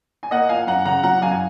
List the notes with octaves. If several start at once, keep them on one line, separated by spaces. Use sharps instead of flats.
G#5
A#3 D#5 F#5
F3 F5 G#5
F#2 F#5 A#5
C#3 F#5 A#5
F#3 F#5 A#5
F#2 F5 G#5
G#5